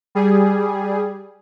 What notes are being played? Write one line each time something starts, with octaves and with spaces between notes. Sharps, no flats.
G3 G#4